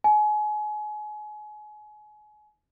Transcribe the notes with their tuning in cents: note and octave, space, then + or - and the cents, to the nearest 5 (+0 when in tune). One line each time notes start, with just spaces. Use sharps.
G#5 +30